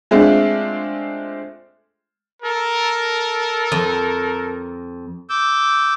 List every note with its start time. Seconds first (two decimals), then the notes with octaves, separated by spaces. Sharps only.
0.11 G#3 A3 C4 D4 F4
2.43 A4 A#4
3.72 F2
5.30 D6 E6 G6